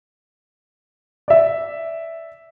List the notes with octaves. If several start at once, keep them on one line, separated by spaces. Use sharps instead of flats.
D5 E5